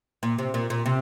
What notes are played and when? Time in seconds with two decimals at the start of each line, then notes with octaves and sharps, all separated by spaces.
0.23 A#2
0.39 C3
0.54 A#2
0.70 A#2
0.86 C3